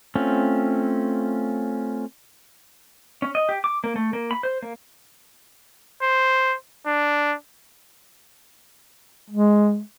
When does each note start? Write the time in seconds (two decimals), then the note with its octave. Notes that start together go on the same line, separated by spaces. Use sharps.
0.15 A3 C4 C#4 F4
3.22 C#4
3.35 D#5
3.49 G4
3.64 D6
3.84 A#3
3.96 A3
4.13 A#3
4.31 B5
4.43 C5
4.62 A#3
6.02 C5
6.86 D4
9.30 G#3